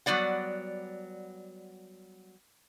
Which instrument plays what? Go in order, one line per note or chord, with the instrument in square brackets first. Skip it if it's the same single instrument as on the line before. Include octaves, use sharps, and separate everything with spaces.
[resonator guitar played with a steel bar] F#3 G3 B3 D5 F#5